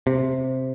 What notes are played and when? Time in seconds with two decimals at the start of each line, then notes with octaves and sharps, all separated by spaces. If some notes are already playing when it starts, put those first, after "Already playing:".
0.07 C3